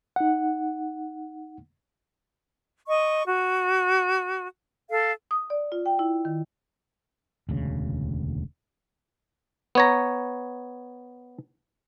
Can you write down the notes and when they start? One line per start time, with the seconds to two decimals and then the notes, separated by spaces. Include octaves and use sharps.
0.16 D#4 F#5
2.86 D#5 C#6
3.26 F#4
4.90 A4 F5
5.31 D#6
5.50 D5
5.72 F4
5.86 G5
5.99 E4
6.25 D#3
7.49 E1 D2 C#3
9.75 B3 C#5 A#5